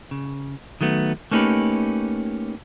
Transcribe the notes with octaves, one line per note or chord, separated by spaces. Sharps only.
C#3
D#3 F#3 A3 B3
A3 A#3 C#4 D#4 G4 B4